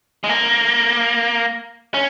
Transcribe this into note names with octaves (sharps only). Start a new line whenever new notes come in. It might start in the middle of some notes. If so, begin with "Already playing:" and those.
G#3
A#3
C#4